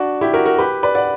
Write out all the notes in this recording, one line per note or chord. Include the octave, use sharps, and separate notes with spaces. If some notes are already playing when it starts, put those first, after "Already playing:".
Already playing: D4 F#4
E4 G4
F#4 A#4
F#4 A#4
G4 B4
B4 D5
D5 F#5